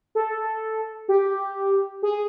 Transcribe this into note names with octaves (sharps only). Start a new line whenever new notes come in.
A4
G4
G#4